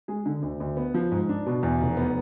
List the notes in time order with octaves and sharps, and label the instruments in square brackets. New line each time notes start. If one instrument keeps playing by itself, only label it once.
[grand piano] G#3 G#4
D3
D2
D2
B3
F3
G#2
D4
B2
E2
F1
B3